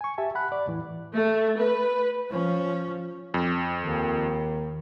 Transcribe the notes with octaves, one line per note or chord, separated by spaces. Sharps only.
G#5 C#6
G4 E5 G#5 A5
F#5 B5 F#6
D5
E2 A2 E3
A3
B4
F3 C#4
F2
D#2 D#3